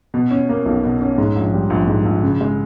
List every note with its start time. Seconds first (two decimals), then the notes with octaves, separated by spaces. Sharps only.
0.14 B2
0.31 C#4
0.49 A#3
0.66 B1
0.83 B2
1.01 C#4
1.18 G#2
1.36 A#1
1.54 G3
1.70 A#1
1.87 G#2
2.05 A#1
2.22 C#3
2.41 G#3